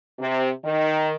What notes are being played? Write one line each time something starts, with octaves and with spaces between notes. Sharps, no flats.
C3
D#3